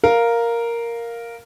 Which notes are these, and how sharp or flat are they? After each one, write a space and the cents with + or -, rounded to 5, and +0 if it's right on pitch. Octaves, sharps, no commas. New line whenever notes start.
A#4 +0 F5 +0